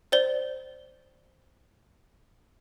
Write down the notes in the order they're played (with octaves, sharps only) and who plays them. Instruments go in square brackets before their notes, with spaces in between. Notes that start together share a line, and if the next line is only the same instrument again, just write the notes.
[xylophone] C5 D5 G7